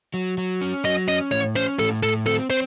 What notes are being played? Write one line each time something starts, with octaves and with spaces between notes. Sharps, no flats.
F#3
F#3
C#4
F#3 D#5
C#4 D#5
A2 C#5
C#4 C5
A2 A4
A2 A4
C4 A4
C4 C5